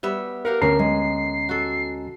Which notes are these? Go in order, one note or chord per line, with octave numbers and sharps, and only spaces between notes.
G3 B3 E5
G4 A#4 F5 F#5
D2 C#4 A#4 A5 A#5 C7
G#3
F#4 A4